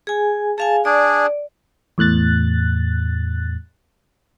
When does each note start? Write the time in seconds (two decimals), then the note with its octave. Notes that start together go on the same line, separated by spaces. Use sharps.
0.07 G#4 G#5
0.58 G#4 F5 G#5 A5
0.85 D4 G#4 D5
1.98 E2 A2 F#6 A6